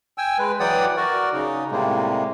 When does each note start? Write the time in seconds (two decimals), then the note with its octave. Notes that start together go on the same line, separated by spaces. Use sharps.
0.18 G5 G#5 E6
0.39 G#3 B4
0.60 E3 F#3 D5 F#5 G5 D#6
0.97 F#4 A#4 D5
1.33 C#3 D#4
1.71 A2 C3 G3 G#3 A#3